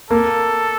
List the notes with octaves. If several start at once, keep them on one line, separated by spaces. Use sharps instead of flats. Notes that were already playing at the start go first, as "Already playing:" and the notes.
A#3 A4